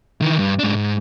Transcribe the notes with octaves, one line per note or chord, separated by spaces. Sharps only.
D#3 E3
G2
G#2 D4
G#2